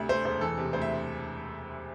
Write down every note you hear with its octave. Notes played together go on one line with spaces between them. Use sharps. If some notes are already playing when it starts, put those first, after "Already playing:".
Already playing: D2 C3 E5
A3 C5
E1 C5
E3 A4
C3
D2 C5
E5